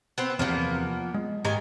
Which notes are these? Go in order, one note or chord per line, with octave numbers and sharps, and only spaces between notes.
B3 C4 C5
E2 C3 F3 A#3 B3
G#3
G#2 D#3 G4 G#5 A#5